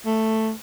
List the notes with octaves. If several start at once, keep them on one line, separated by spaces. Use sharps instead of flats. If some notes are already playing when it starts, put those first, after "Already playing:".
A3